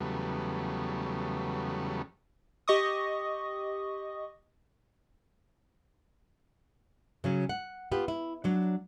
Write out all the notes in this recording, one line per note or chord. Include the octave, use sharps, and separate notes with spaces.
E2 C#3 F#3 G3 A3 B3
G4 D#5 C#6 D#6
C#3 F#3 C#4
F#5
B3 F4 G4
E4
F#3 D4